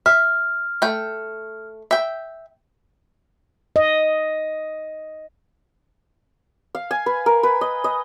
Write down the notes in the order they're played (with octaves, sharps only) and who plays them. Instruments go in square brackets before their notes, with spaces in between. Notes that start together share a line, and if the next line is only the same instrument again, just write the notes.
[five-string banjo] E5 [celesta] F6
[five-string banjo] A3 G5
E5 G5
[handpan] D#5
[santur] F5
G#5
B4
A#4
B4
D#5
D#5